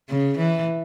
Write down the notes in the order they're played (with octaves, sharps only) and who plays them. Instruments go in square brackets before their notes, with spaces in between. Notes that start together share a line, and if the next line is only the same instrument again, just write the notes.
[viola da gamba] C#3
E3